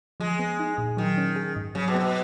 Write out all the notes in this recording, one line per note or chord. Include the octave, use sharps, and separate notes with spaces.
F3 G#3
B3
D#4
A#2
D#3 F#3
C#4
G#4
G#2
C#3 F#3
B2
B3
B2